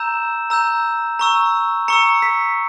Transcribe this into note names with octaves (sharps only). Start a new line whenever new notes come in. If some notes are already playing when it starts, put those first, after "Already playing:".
Already playing: A#5 E6 G6 E7
A#5 E6 G6
A#5 C#6 E6
A#5 C#6 E6 C#7
B6